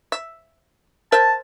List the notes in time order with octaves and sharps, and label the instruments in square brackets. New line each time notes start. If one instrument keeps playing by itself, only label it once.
[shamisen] E5
[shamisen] A#4 C5 E5 [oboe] A5